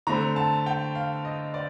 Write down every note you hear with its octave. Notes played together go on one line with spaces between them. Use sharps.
D3 A3 C4 A#5
A5
G5
F5
D#5
D5